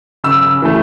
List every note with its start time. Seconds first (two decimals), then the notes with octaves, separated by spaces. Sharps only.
0.24 C#3 E6
0.62 E3 A3